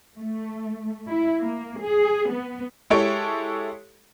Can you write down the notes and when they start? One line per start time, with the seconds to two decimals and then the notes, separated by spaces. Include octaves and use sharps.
0.17 A3
1.08 E4
1.43 A#3
1.81 G#4
2.32 B3
2.90 G#3 E4 G4 A4 C#5 D7